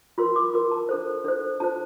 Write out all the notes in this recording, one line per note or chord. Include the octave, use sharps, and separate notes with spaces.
F4 A#4 C6
D6
F4 A#4 C6
A5
D4 A4 C5
D4 A4 C5
D4 F4 C5 A5